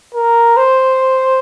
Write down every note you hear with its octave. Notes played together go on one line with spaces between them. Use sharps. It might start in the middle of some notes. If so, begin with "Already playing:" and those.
A#4
C5